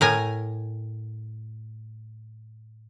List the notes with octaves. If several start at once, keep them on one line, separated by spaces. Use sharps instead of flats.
A2 A#4 G#5